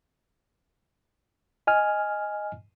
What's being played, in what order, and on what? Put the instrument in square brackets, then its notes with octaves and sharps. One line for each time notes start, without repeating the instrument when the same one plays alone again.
[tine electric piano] D#5 G#5 F6